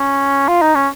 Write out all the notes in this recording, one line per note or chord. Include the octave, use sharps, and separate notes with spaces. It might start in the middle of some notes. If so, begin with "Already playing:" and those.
Already playing: C#4
F4
D#4
C#4